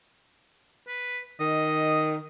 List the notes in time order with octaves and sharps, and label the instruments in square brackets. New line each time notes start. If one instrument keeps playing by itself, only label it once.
[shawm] B4
[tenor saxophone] D#3 [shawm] D#5